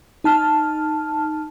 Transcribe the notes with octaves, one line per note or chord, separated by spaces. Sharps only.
D#4 A5 F6